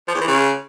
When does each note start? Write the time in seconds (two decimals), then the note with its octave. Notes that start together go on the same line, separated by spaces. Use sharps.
0.08 F3
0.14 E2
0.21 E3
0.28 C#3